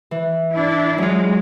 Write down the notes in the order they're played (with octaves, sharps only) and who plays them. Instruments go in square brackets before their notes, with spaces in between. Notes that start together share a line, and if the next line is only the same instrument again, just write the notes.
[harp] E3
[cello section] D4 E4
[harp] F#3 F4 [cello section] G#3